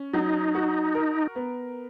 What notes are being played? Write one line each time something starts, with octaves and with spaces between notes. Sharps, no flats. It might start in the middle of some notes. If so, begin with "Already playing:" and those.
Already playing: C#4
F#3 D#4
F#4
A#4
B3